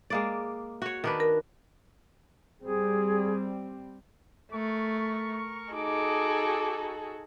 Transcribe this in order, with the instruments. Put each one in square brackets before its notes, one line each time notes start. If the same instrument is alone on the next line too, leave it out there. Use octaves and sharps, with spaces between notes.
[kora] G#3 A#3 D5
F#4 C#5
D#3 D4 B4
[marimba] A#4
[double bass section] G3 C4 [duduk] G#4
[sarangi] A3 [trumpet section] A#4 C#6
[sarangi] D#4 [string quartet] F#4 G#4 A4 [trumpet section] D6